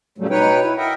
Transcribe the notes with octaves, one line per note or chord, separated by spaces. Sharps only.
A2 C#3 F#3 G3 A3
B2 D#4 B4 C#5 G5
E4
A#4 D#5 E5 F#5 G5